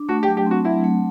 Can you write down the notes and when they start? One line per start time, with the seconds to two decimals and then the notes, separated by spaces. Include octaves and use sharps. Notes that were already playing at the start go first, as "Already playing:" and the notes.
Already playing: D4
0.09 A3 F#4
0.23 G4
0.28 F#3
0.37 G4
0.46 C4 F#4
0.65 F#3 E4
0.84 A3